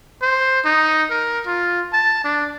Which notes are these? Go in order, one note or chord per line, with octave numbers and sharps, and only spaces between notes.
C5
D#4
A#4
F4
A5
D4